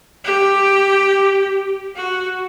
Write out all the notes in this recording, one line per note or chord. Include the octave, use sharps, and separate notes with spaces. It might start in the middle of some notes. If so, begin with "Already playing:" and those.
G4
F#4